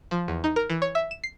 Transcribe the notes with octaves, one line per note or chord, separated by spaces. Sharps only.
F3
E2
D#4
A#4
E3
C#5
E5
E7
C7